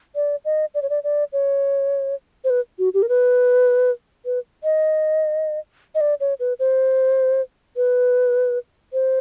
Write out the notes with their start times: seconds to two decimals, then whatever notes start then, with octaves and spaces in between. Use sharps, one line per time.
0.15 D5
0.45 D#5
0.74 D5
0.82 C#5
0.90 D5
1.04 D5
1.33 C#5
2.44 C5
2.50 B4
2.79 F#4
2.94 G4
3.02 A#4
3.09 B4
4.25 B4
4.64 D#5
5.95 D#5
6.01 D5
6.20 C#5
6.40 B4
6.59 C5
7.76 B4
8.93 C5